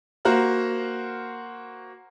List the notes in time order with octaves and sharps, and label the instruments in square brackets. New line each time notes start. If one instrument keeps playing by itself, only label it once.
[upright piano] A#3 F#4 C5 A#5 F6 F#6